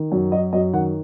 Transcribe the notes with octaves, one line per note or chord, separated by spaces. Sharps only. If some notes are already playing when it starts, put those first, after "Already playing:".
Already playing: D#3
F#2
F#3 D#5
F#2 D#5
D#3 F#5